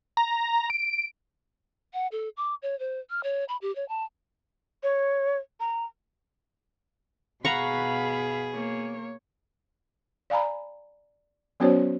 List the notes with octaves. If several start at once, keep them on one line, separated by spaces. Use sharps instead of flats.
A#5
D7
F#5
A4
D6
C#5
C5
F6
C#5
B5
G4
C#5
A5
C#5
A#5
B2 G#4 F5 F#5 A#5 B5 C#6
A#3 C#5
D5 F5 G#5 A#5 B5
F#3 B3 C#4 F#4 C5 C#5